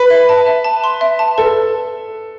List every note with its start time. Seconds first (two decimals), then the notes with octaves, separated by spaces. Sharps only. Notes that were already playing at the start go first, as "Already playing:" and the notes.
Already playing: B4
0.10 E5
0.29 A5
0.46 E5
0.64 A5
0.84 C6
1.01 E5
1.19 A5
1.38 A4 B4